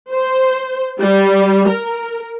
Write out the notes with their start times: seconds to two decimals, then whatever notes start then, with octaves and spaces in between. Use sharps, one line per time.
0.10 C5
1.00 G3
1.68 A#4